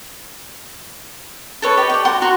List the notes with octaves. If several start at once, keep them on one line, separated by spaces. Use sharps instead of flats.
A4 B4 C#5
G4 D#5 G5
D5 G5
F#4 F#5 C6
F#4 A#5 C6